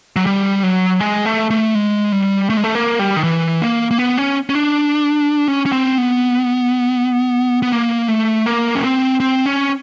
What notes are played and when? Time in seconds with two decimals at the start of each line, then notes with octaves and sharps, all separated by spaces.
0.16 F#3
0.26 G3
0.63 F#3
1.00 G#3
1.26 A3
1.50 A3
1.75 G#3
2.12 G3
2.50 A3
2.57 G#3
2.64 A3
2.75 A#3
2.99 G3
3.16 D#3
3.24 E3
3.62 A#3
3.91 A#3
3.98 B3
4.18 C#4
4.50 C#4
4.55 D4
5.48 C#4
5.66 C#4
5.72 C4
5.98 B3
7.62 B3
7.72 A#3
8.08 A3
8.46 A#3
8.75 C#4
8.84 C4
9.20 C4
9.46 C#4